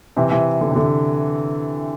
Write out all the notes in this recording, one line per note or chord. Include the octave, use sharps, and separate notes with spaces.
C3 E3
C3 E3
D3
C3
D3